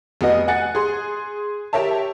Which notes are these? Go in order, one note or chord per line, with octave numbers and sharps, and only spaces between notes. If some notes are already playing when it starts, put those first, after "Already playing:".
F1 B3 F#4 D#5
F#5 G#5 F#6 A6 C#7
G#4 C6
G4 A#4 C#5 E5 A5